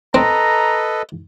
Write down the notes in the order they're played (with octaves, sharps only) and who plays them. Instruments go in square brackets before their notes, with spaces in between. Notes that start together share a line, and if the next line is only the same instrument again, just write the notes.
[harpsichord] C4 [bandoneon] A4 B4 D#5 [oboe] A#5